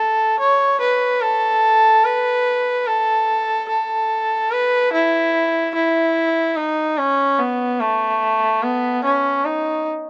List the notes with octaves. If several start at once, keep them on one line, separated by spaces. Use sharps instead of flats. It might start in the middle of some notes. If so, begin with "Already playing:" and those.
Already playing: A4
C#5
B4
A4
B4
A4
A4
B4
E4
E4
D#4
C#4
B3
A3
B3
C#4
D#4